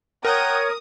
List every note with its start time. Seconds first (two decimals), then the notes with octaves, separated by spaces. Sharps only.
0.25 A#4 C#5 F#5 G5 A#5 D#6